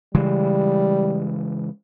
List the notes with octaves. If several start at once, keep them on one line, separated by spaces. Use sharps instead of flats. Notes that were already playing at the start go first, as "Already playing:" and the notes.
C#3 E3 G3 G#3